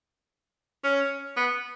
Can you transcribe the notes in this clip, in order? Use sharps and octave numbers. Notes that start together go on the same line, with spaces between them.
C#4
B3